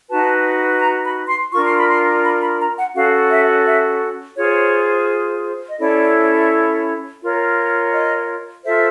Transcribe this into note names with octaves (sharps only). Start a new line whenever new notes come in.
D#4 F#4 B4 A5
A#5
B5
C6
D4 F4 A#4 C#6
C6
B5
C6
B5
B5
A#5
F#5
C#4 F#4 A4 F5
E5
E5
F4 G#4 C5 C#5
D#5
C#4 E4 A4 C#5 D5
F4 A#4 C#5
D#5
F4 A4 C5 E5